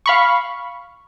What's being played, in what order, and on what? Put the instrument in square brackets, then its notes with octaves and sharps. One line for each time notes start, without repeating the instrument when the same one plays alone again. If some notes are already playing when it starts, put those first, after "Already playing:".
[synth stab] F5 B5 C#6